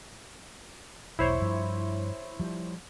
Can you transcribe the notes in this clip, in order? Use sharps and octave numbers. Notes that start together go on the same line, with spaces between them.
E1 B1 E4 C5 C#5
G2 F3
F3 G3